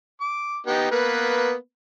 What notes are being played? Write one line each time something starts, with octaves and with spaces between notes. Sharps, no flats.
D6
B3 D#4 G4
A#3 B3 B4